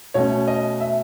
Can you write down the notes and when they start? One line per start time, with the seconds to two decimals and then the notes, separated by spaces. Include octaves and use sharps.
0.14 B2 A3 C#4 C#5
0.48 D#5
0.80 E5